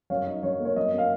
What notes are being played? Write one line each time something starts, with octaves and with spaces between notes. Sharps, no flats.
F#2 C#5 F5
D#4
F#2 C#5
A#3
C#5
F#2 D#5
A#3
F5